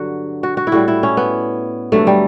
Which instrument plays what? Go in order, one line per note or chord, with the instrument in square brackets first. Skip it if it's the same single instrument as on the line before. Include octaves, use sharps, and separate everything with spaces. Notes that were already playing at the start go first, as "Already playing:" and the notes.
Already playing: [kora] G2 D3 F#3 F#4
F#4
F#4
E4
A2 G3 F#4
E4
C#4
B3
G2 D3 F#3 A3
G3